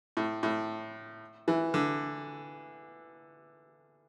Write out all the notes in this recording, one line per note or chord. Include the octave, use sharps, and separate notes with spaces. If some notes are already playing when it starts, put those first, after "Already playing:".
A2
A2
E3
D3